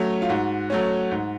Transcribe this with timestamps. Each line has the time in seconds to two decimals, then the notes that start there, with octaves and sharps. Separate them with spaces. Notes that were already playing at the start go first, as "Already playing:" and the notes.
Already playing: F#3 A3 C#4
0.22 F4
0.29 G#2 F#4
0.70 F#3 A3 C#4
1.11 G#2